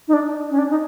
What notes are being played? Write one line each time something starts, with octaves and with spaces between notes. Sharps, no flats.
D#4
D4
C#4
D4
D#4